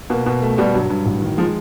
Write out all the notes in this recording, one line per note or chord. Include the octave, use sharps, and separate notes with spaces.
B2 A#3
B2
A3
B2 G3
G2 F#3
G2
A1
D#3
F3 G#3